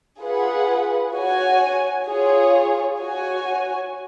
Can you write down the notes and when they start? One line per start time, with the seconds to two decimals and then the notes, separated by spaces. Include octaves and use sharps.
0.20 F4 G#4 B4 F#5
1.13 F#4 C#5 G#5
2.06 F4 G#4 C#5
3.00 F#4 C#5 G#5